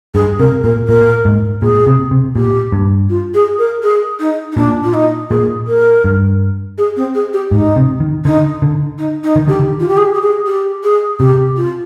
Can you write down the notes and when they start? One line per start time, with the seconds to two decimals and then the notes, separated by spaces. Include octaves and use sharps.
0.14 G2 G#4
0.39 C3 A#4
0.64 A#2 A#4
0.88 A#2 A#4
1.25 G#2
1.62 A#2 G#4
1.87 C3
2.11 C3
2.36 A#2 G4
2.72 G2
3.09 F4
3.34 G#4
3.59 A#4
3.83 G#4
4.20 D#4
4.52 D#4
4.57 A#2 D4
4.83 F4
4.94 D#4
5.30 A#2 G#4
5.67 A#4
6.04 G2
6.78 G#4
6.96 C4
7.15 G#4
7.33 G4
7.51 G#2 D#4
7.76 C3
8.00 D#3
8.25 D3 D#4
8.62 D3
8.98 D#4
9.24 D#4
9.36 D#3
9.48 D3 G4
9.60 D#3
9.80 F4
9.88 G4
9.97 G#4
10.14 G4
10.22 G#4
10.46 G4
10.84 G#4
11.20 C3 G4
11.57 F4